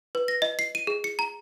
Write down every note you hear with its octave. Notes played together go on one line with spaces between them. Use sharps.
B4
A#6
D#5
C7
D#7
G#4
C#7
A#5